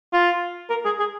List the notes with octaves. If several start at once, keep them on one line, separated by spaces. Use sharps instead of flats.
F4
A#4
G#4
G#4